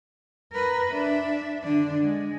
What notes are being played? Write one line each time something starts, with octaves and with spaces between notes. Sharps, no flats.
A#4 B4
D4 E5
D3 D4
G#3